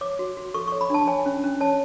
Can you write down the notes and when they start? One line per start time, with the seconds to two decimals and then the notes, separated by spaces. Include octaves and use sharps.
0.01 C#5 D6
0.19 F#4
0.37 F#4
0.54 A4 C#6
0.68 C#6
0.72 C#5
0.81 B5
0.90 D4 A5
1.08 C#5 G#5
1.26 C#4
1.44 C#4
1.61 C#5 A5